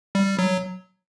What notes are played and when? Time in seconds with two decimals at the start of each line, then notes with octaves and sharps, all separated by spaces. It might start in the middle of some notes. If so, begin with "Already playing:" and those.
0.15 G3
0.39 F#3